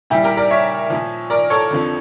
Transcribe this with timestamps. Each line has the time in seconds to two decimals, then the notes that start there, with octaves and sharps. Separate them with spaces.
0.10 A#2 G3 E4 G4
0.24 G4 A#4
0.37 A#4 D5
0.51 C#5 E5
0.90 A#2 F3
1.30 A#4 D5
1.50 A4 C#5
1.71 F2 D3 F3